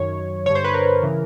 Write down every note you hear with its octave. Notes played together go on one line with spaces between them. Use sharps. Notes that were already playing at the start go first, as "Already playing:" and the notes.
Already playing: F#2 D#3 C#5
G2 D3 C#5
C5
B4
A#4
C#3 E3